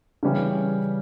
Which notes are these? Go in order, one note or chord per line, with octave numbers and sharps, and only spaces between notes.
C#3 E3 G3 C#4